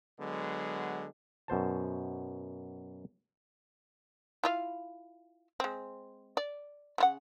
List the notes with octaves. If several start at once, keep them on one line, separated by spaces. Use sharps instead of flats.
D3 F#3 G#3 B3
F#2 B2 C5 A5
E4 F4 F5
G#3 C4
D5
C#3 E4 F#5